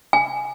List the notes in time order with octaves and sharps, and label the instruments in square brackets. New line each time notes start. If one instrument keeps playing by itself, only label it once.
[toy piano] G#5